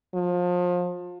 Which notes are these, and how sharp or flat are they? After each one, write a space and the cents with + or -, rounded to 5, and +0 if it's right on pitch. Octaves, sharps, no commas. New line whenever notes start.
F3 +30